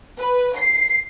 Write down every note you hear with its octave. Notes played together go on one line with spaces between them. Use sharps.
B4
C7